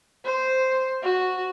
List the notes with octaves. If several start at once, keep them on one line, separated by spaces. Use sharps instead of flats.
C5
F#4